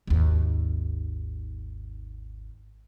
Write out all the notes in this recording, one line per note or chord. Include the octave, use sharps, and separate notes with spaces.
G#1 D#2